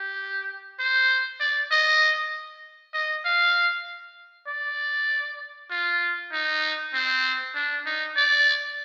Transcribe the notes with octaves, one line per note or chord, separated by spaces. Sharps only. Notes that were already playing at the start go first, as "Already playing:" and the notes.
Already playing: G4
C5
D5
D#5
D#5
F5
D5
F4
D#4
C4
D4
D#4
D5